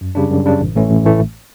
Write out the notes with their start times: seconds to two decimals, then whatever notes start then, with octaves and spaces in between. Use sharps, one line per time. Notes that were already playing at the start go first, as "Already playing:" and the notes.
0.01 F#2
0.15 C#3 G3 D4
0.31 F#2
0.45 C#3 G3 D4
0.60 A1
0.76 A2 E3 A3 C#4
0.90 A1
1.05 A2 E3 A3